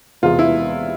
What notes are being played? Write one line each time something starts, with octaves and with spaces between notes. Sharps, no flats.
E1 E2 C3 G#3 F4
E4